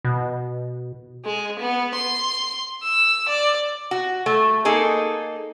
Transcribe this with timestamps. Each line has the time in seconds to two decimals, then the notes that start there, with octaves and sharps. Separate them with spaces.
0.05 B2
1.25 G#3
1.59 B3
1.95 C6
2.82 E6
3.28 D5
3.91 F#4
4.26 A3
4.65 A#3 D#4 G#4 A4